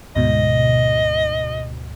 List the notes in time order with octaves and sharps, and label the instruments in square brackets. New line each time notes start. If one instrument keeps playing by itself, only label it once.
[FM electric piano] D2 G#2 B2 [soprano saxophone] D#5